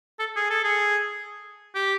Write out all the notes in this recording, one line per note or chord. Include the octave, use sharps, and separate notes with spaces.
A4
G#4
A4
G#4
G4